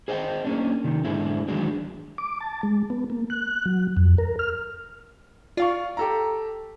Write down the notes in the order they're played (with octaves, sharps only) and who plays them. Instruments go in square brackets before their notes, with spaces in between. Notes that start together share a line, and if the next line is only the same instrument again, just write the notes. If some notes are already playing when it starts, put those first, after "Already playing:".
[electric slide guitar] G#4 C5 D#5 F#5 G5
A#3 C#4 D4
C3 D#3
G#2 D3 G#3 E4
D#3 E3 F#3 G#3 D4
[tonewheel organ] D6
A5
G#3
B3
A#3
F#6
F#3
F2
A#4
F6
[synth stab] F4 [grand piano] D5 F5 C#6
[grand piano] G4 A4 A#5